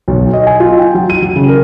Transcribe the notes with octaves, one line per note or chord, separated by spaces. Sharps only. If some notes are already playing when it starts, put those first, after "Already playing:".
B1
D#5
G#5
F4
G5
F#3
D#7
F#3
C#3
A#4